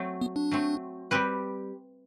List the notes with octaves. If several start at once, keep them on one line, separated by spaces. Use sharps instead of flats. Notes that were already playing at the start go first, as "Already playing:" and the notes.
Already playing: F#3 A3 C4
B3
D4
F#3 A3 C4
G3 C4 G4 B4